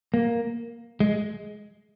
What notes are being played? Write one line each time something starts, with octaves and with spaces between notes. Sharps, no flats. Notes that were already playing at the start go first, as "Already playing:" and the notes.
A#3
G#3